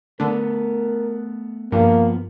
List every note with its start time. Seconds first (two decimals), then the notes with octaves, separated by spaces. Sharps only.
0.20 D3 A3 B3 D4 A#4
1.72 G2 F3 A#3 B3